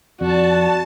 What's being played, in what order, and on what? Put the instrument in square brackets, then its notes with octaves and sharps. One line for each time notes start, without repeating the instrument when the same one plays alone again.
[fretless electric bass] F2 [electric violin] F#4 [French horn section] D5 [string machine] A5